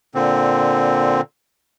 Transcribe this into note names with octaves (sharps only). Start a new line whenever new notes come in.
A#2 D3 C4